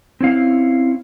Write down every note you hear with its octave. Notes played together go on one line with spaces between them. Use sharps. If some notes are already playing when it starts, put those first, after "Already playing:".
C4 C#4 E4 F5